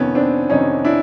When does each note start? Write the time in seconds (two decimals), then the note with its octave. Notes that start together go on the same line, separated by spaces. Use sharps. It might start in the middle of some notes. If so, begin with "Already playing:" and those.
Already playing: F2 C3 D#3 B3 C#4
0.15 C4 D4
0.50 F2 C3 D#3 C#4 D#4
0.85 D4 E4